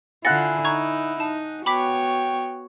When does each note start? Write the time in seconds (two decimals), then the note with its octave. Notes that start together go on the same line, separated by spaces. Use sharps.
0.25 D3 E4 F4 F#5 G#5 A6 A#6 C#7
0.65 D#4 A#5 C#6 G#6
1.20 D#4 A5
1.66 B3 F#4 C#5 G5 B5 D6 B6